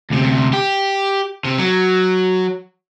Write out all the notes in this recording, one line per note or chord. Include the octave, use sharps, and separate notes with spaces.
D2 C3
G4
C3
F#3